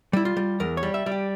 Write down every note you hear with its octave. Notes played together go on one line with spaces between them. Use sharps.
G3 E4
F4
G3
E2 A#4
C#5
G3
E5
G3
G4